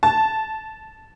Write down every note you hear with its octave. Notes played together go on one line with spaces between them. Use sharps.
A5